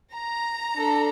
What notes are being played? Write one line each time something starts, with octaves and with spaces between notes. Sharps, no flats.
A#5
D4 A4